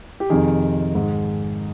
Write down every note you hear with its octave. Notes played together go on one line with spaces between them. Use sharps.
G4
F2 C3 D#3 G#4
G#2 D#3